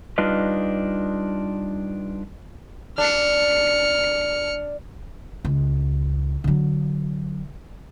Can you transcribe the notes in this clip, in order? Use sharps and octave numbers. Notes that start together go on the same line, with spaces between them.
G3 D4 D#4 F4 B4 D#5
D4 F6 C#7
C#2
D3 F#3